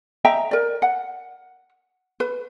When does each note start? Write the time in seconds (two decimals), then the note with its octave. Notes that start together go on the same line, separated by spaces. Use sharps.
0.25 D#5 E5 G5 A#5
0.51 A#4 D5
0.82 F#5
2.20 B4